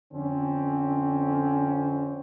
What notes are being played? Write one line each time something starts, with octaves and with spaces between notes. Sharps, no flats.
F2 D3 C4 C#4